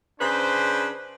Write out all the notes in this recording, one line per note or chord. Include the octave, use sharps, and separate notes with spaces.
C#3 D4 B4 C5